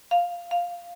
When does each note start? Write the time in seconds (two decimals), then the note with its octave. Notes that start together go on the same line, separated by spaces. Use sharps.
0.11 F5
0.51 F5